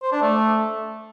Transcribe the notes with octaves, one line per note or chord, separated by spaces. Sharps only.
C5
D4
A3